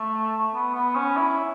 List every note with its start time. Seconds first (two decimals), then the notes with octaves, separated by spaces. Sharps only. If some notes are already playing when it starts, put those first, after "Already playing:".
Already playing: A3
0.54 B3
0.75 B3
0.95 C#4
1.17 E4